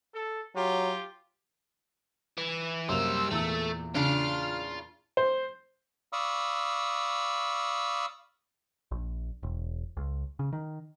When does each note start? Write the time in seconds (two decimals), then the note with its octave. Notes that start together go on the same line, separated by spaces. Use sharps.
0.13 A4
0.56 F#3 F4 G4
2.38 E3
2.89 F#2 G3 A#3 C5 E6 F7
3.31 E2 A#2 E3 A3
3.95 C#3 D4 F4 F6
5.17 C5
6.13 D5 F5 B5 C#6 D#6 E6
8.91 A#1
9.43 E1
9.97 C#2
10.39 C#3
10.53 D#3